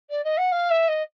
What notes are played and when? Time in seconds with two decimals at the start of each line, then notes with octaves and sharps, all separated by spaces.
0.10 D5
0.24 D#5
0.37 F#5
0.52 F5
0.70 E5
0.88 D#5